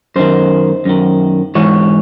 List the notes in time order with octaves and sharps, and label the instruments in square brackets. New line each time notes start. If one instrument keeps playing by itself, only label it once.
[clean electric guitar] F#2 D#3 C5
F#2 D#3
G#2 E3 C#5